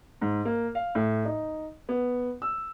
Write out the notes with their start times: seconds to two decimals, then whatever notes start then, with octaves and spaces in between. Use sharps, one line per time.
0.21 G#2
0.45 A#3
0.75 F5
0.95 A2
1.25 D#4
1.89 B3
2.42 E6